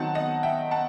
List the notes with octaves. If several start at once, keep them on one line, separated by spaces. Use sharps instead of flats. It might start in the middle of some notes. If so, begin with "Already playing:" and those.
Already playing: D#3 F#3 C4 D#4 F#5 A5
D#5 F#5
E5 G5
F#5 A5